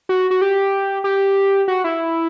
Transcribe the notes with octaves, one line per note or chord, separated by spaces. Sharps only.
F#4
F#4
G4
G4
F#4
E4